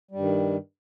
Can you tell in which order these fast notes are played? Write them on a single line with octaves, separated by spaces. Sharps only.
G3 G2 D#3